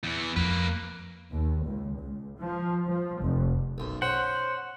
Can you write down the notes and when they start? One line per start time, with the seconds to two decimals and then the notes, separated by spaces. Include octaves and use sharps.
0.04 E2 E3
0.36 F2 A#3 B4
1.31 D#2
1.67 C#2
2.00 C#2
2.38 F3
2.87 F3
3.21 F1
3.78 B1 F#2
4.02 C#4 C5 F#5